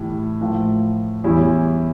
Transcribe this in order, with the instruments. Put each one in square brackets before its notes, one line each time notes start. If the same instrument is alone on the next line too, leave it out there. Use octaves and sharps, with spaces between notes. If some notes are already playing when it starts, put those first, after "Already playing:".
Already playing: [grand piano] A2 E3 G3
A2 F3 A#3
E2 E3 G3 C#4 E4